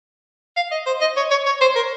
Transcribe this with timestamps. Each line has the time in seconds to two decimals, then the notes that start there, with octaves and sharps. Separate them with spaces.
0.57 F5
0.72 D#5
0.86 C5
1.01 D#5
1.17 C#5
1.31 C#5
1.46 C#5
1.61 C5
1.76 A#4